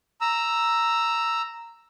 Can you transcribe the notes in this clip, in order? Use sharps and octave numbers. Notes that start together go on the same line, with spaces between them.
A#5 E6